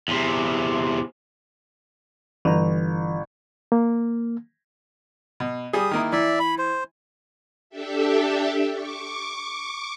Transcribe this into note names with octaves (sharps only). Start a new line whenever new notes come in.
E2 C3
G1 E3 A#5
A#3
B2
G3 G#4 D#6
D#3 A#3 E4
E3 D5 E5
B5
C5
D4 G4 A4 E5
C#6 D6